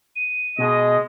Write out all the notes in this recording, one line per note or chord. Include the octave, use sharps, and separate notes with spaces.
D#7
B2 G#3 D#5